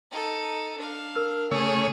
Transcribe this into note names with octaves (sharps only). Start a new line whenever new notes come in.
D#4 A4
D4 F5
A#4 E6 F6
C#3 A3 G#4 C#5 E6